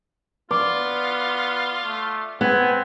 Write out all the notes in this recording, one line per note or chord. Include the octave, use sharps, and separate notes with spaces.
B3 F4 D5
A3
B3 C4 G#5